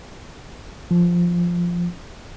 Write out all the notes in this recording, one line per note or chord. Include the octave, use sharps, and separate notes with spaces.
F3